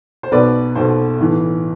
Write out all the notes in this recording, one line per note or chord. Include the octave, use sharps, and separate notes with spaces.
C5
B1 B2 B4 D5
B1 B2 A4 C5
B1 A2 E3